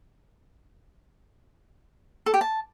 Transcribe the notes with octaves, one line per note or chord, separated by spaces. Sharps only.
A4
G4
A5